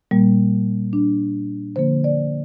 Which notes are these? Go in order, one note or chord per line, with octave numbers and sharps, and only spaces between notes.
A#2 G3 A#3
D4
D3 F3 A#3 C5
D5